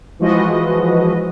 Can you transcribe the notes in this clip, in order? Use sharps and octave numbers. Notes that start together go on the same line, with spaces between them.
E3 F3 G#3 F#4 B4 D#5